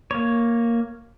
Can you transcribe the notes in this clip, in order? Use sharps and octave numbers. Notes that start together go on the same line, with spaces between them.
A#3 C#5